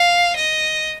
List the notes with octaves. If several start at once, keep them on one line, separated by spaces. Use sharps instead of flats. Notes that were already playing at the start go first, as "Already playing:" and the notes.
Already playing: F5
D#5